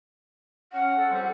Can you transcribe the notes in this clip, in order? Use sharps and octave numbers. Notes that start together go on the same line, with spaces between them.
C#4 F#5 F6
A4
F2 G3 C4